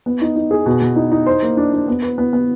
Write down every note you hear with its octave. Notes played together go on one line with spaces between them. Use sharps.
B3
D#4
D#4
G#4
B2
B2
D#4
D#4
C5
A#3
D4
D4
B3
B4
B3
B3